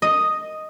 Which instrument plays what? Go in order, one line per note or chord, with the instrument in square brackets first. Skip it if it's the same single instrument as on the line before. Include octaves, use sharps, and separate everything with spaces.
[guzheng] D#5